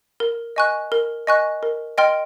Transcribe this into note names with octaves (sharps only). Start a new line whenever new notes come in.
A#4
D#5 G#5 C#6 F#6
A#4
D#5 G#5 C#6 F#6
A#4
D#5 G5 C6 F6